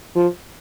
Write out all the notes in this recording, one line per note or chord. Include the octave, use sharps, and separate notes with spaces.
F3